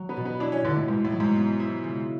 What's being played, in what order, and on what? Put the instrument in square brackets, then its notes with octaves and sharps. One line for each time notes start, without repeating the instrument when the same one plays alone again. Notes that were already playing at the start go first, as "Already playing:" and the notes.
Already playing: [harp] F#3
[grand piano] B3
[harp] B2
[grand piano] B3
[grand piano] D4 [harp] E4
[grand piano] C#4
[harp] B2 [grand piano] D3
[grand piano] A2
[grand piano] G#2 [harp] B2
[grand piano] A2
[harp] F#3
[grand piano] G#2
[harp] B3
E4
C#3